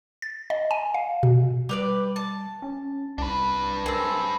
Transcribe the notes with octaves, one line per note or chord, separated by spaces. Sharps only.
A6
D#5
G#5
F5
B2
G3 G4 B4 D5
A5
C#4
C2 D4 B4
C4 G#4 A#4